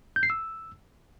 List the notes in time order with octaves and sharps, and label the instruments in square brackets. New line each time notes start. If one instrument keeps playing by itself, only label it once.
[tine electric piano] G6
C7
E6